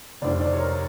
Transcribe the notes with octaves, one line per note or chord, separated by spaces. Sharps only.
F1 D#2 D#3 C5 D5
C5 D5
C#5
A#4 C5